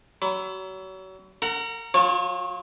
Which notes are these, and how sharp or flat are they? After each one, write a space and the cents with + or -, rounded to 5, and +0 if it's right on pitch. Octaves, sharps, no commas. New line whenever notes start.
F#3 +35 B5 +35
A#4 -40 F#5 +0 A#5 +0
F#3 -30 F4 +20 C#5 -35